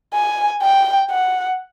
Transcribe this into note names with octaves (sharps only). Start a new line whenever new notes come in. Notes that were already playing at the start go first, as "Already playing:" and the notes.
G#5
G5
F#5